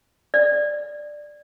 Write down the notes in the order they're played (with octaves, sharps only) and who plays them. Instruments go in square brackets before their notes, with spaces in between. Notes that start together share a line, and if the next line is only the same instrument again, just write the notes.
[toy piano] D5